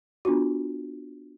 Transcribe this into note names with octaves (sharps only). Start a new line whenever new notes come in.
B3 D4 F4 F#4